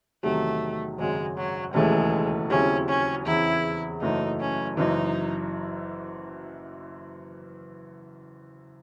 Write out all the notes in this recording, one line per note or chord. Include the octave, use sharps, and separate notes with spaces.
E2 C3 D#3 F#3 A3
G#1 F#2 C#3 F#3 G#3
F#3
E1 D#2 C#3 E3 G#3 A3
D#2 C#3 F#3 C4 C#4 E4
C#4
E2 C#3 E3 C4 E4
F#1 F#2 E3 A3 D#4
C#4
F#1 F#2 E3 D#4